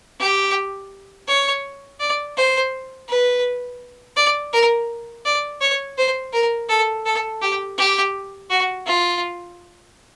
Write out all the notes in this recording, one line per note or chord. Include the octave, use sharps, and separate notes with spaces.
G4
C#5
D5
C5
B4
D5
A#4
D5
C#5
C5
A#4
A4
A4
G4
G4
F#4
F4